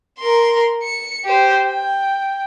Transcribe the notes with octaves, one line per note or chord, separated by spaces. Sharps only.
A#4 C6
C#7
G4 C5
G5